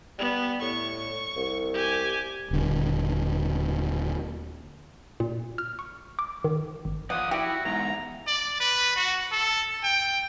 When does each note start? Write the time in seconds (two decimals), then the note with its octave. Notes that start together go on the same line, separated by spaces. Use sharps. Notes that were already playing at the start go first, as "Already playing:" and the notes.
0.19 G3 B3
0.62 A2 C#6
1.36 C2
1.74 G4 G#5
2.51 D#1 D3
5.20 A#2
5.58 F6
5.79 C#6
6.19 D6
6.44 D#3
6.85 G#1
7.10 F3 D5 F#5 D#6
7.31 E4 F#4 G4
7.65 E2 G#2 A#5
8.27 D5
8.60 B4
8.96 F#4
9.32 A4
9.83 G5